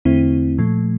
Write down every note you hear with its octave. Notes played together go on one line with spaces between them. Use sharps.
E2 D3 A3 C4 E4
A#2 F3 A3